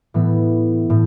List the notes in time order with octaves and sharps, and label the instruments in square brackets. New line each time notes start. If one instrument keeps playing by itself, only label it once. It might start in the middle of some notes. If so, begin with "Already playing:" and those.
[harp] A2 E3 B3
A2